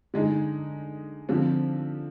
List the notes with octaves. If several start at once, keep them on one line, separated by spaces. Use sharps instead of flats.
D3 G#3 D#4
D3 F3 C4